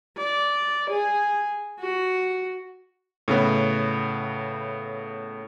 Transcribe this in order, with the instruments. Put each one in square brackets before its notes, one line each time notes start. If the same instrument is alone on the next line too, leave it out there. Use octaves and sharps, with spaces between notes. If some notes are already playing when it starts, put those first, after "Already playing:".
[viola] D5
G#4
F#4
[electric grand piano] A2 C#3 B3